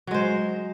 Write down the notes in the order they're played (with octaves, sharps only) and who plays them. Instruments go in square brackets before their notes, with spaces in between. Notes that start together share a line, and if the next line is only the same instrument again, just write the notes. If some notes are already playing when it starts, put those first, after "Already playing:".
[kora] F#3
G#3
C5